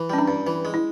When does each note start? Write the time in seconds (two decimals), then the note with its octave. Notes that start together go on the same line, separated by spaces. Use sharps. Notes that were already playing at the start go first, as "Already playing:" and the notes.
Already playing: E3
0.10 G3 C#4
0.18 D4
0.28 G2
0.47 E3
0.65 G#3
0.74 E4